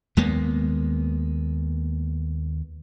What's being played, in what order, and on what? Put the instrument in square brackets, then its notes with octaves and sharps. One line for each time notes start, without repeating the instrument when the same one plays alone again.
[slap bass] D#2 G#3 A#3 B3